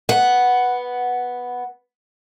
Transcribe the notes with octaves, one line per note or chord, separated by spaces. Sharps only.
B3 F#5